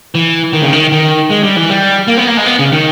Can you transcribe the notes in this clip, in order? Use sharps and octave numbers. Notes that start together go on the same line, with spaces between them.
E3
D#3
C#3
D#3
D#3
G#3
G3
E3
G3
A#3
B3
A#3
G#3
B3
C#3
D#3